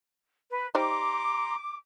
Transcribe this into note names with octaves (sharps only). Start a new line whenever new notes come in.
B4
G3 D#4 C5 A#5 C6 D6